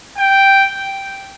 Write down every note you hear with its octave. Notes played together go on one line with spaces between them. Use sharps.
G5